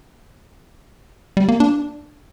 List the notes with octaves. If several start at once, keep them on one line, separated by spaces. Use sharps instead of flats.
G3
A#3
D4